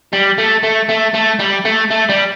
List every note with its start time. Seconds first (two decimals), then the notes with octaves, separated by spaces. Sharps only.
0.13 G3
0.38 A3
0.63 A3
0.89 A3
1.14 A3
1.39 G3
1.65 A3
1.91 A3
2.09 G3